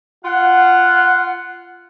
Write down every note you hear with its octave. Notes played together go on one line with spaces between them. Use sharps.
F4 F#5